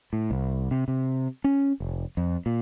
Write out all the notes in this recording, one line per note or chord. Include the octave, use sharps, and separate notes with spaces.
A2
C2
C3
C3
C#4
F1
F2
A#2